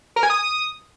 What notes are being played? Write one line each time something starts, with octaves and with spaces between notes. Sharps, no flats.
A#4
G#5
D#6